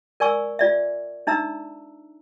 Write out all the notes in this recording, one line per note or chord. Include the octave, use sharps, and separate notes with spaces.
A#4 D5 G#5 C#6 E6
F4 D5 E5
D4 D#4 E5 A#5 E6